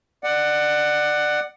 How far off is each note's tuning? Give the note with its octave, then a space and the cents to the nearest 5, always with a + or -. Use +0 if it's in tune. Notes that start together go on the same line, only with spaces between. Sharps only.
D5 +25 F#5 +5